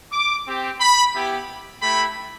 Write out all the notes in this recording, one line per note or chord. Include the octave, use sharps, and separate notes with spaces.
D6
C4 G4
B5
B3 E4 G4
A3 E4 G4 B5